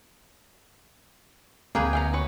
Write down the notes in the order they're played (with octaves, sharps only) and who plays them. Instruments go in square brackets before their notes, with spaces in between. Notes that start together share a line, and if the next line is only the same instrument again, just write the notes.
[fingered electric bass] D2 C4 [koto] A#3 G#4 B4 [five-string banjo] A#4 G5
[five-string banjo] B3 F5 G#5 [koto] G5 A#5
[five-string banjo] F#4 B4 C#5